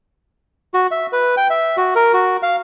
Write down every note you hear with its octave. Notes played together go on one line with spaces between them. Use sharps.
F#4
E5
B4
G5
E5
F#4
A#4
F#4
F5